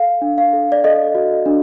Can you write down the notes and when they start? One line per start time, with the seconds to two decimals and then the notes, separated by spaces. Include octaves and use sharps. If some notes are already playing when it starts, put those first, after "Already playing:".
Already playing: A4 F5
0.22 D4
0.38 F5
0.53 A4
0.72 D5
0.84 A4 D#5
1.15 F#4
1.46 D4